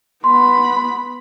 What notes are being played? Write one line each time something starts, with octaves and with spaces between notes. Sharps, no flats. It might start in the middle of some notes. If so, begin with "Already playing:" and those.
B3 B5 C6